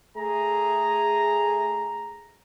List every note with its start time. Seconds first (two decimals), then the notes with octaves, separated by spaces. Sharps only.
0.17 A3 G#4 A#5